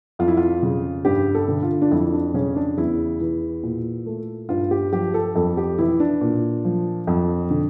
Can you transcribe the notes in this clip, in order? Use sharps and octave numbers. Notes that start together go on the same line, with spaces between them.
F2 F4
E4
F4
C#3
G2 G4
A4
D3
F4
D4
F2 E4
D4
C#3 C#4
D4
E2 E4
E3
A#2
A3
G2 F4
G4
F3 G4
A4
F2 A4
G4
E3 E4
D4
A#2
F3
F2
D3